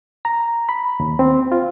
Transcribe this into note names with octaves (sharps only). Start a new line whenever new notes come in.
A#5
B5
D#2
C4
F4